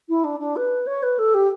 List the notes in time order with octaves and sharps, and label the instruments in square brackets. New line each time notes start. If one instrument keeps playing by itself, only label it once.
[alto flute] E4
D4
D4
B4
C#5
B4
A4
G4